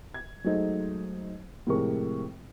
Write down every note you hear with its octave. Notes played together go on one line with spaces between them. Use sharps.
G#6
F#3 G#3 A3 D#4 C5 D#5
A2 C3 F3 G#3 A#4 C#6